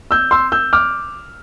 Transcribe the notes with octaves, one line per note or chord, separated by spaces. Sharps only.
E6 G6
C6 E6
E6 G6
D6 F6